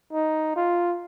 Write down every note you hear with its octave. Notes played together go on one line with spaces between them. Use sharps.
D#4
F4